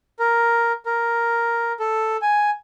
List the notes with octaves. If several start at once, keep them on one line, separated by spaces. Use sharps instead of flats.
A#4
A#4
A4
G#5